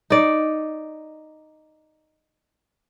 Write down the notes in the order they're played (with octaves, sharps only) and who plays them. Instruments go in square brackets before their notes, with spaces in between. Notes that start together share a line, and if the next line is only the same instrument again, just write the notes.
[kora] D#4 D5